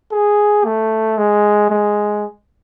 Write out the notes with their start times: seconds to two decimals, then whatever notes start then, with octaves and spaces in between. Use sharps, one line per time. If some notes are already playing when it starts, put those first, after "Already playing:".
0.12 G#4
0.65 A3
1.18 G#3
1.70 G#3